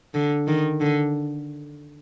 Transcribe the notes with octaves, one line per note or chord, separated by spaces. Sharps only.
D3
D#3
D3